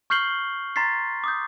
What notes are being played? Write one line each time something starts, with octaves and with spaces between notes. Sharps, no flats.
C#6 F6 G6 C7 F#7 G7
A#5 C6 A6 B6 C7
D6 D#6 G6